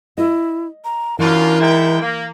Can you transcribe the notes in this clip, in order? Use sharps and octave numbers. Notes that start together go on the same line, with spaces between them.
E4 D#5
A#5
F#2 E3 D4 F4 A#4
G#2 E4 G5
A#3